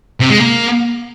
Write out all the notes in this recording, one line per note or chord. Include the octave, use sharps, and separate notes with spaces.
C3
G#3
A#3